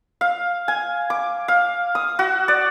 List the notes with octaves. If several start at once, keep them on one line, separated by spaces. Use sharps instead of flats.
F5
G#5
D6
F5
D#6
F#4
D5